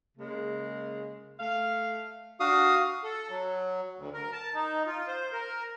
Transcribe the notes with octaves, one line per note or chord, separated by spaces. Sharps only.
C#3 G#3 A#3
A3 F5
D4 F#4 F5 D#6
A4
F#3
D2
A#4
A5
D#4
F4
C5
A#4